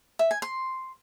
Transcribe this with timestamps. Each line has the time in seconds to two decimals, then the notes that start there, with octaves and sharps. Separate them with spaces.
0.19 E5
0.31 G#5
0.42 C6